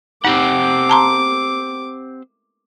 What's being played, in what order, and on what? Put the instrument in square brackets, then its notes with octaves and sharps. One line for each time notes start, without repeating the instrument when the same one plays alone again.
[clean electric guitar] C4 G4 F#5 [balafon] D#4 [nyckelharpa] D6
[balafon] A5 A#5 C6